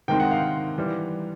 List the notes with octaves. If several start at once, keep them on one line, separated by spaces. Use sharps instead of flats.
C3 D#3 G#3 C4 D#4 G5
F#5
F5
E3 G3